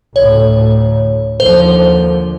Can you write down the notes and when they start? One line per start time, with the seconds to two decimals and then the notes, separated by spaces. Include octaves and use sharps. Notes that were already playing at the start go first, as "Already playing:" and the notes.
0.16 D2 A2 C#5
1.40 D#2 D3 F3 C5